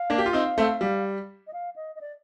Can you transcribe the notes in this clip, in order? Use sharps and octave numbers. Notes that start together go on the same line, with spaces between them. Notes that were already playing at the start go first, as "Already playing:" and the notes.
Already playing: F5
A#3 D4
G4
F4
C4 D#4
A3 C4
G3
D#5
F5
D#5
D#5
D5